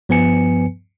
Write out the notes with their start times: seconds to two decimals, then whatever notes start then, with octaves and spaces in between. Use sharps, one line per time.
0.09 G2 F3 B3 B4 G#5 C#7